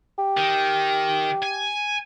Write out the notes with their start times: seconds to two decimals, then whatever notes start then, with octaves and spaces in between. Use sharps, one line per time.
0.19 G4
0.37 D#3
1.42 G#5